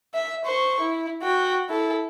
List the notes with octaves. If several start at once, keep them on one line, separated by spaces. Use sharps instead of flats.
E5
C5 C#6
E4
F#4 G5
E4 A4